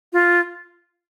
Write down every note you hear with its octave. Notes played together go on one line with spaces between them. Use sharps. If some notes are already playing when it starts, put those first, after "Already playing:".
F4